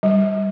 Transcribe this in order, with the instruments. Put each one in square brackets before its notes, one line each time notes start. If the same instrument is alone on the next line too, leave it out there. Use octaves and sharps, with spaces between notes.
[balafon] G3